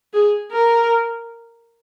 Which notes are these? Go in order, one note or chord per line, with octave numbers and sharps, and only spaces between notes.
G#4
A#4